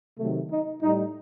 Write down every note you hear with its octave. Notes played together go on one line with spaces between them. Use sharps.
C3 D#3 F#3 A3
D#4
A2 G3 D#4